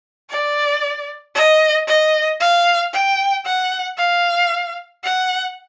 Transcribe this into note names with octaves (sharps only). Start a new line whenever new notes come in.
D5
D#5
D#5
F5
G5
F#5
F5
F#5